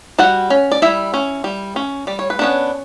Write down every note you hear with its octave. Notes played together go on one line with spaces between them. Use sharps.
G3 F#4 F#5
C#4
D5
G3 E4 E5
C#4
G3
C#4
G3 D5
C#5
B4
B3 C#4 D4 C#5